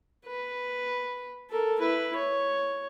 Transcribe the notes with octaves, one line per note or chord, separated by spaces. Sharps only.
B4
A4 A#4
E4 B4
C#5